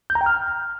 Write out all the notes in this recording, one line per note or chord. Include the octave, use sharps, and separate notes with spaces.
G6
A#5
G5
F6